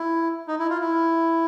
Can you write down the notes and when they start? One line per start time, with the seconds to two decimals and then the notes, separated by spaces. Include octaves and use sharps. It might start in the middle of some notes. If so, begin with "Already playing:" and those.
Already playing: E4
0.48 D#4
0.59 E4
0.70 F4
0.80 E4